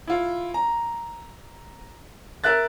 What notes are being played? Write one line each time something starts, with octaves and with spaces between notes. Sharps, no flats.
E4 F4
A#5
A#4 E5 F#6 A6